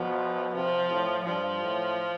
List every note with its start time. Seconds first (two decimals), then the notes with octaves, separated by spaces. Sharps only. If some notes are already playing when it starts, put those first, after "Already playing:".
Already playing: B2 F3
0.55 C3 F3
0.90 A2
1.25 G2 F3
1.62 A2